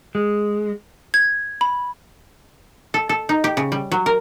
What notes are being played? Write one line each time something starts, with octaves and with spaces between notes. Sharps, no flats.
G#3
G#6
B5
A4
A4
D#4
G4
C#3
G3
F#3
A#4